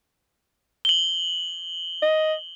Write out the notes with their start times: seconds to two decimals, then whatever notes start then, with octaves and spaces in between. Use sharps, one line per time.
0.85 F#7 G7
2.02 D#5